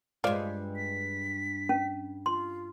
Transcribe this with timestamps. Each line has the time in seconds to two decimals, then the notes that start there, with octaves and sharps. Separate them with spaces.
0.24 G2 G#3 F4 C5 D5
0.76 B6
1.69 C#4
2.26 F4 C6